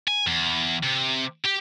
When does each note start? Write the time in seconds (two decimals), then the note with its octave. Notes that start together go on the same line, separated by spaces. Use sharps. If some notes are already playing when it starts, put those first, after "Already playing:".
0.08 G#5
0.27 E2
0.83 C3
1.45 G4